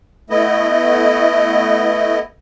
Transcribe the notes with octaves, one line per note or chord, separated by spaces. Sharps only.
A3 B3 E4 D#5